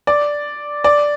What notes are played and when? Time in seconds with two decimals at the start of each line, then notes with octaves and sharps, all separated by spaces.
0.07 D5
0.84 D5